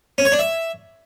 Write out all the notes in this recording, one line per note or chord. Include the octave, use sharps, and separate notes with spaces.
C#4
C#5
D4
E5